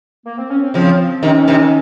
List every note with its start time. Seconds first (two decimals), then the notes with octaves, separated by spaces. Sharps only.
0.26 A#3
0.38 C4
0.50 C#4
0.63 C4
0.74 C#3 F3
1.23 C3 D#3 C#4
1.47 C3 D#3